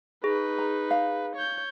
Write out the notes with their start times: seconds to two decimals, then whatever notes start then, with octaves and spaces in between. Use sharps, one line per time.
0.24 D#4 G#4 B4
0.58 A#5
0.91 F5
1.35 C#5 G6